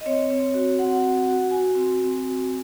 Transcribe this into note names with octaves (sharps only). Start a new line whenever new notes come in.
D#5
C4 C#5
C4
F#4
C4 F#5
F#4
F#4
F#4 G#5
C4
C4
F#4